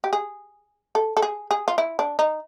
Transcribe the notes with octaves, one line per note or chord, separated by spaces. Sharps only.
G4
G#4
A4
A4
G#4
G#4
F4
E4
D4
D#4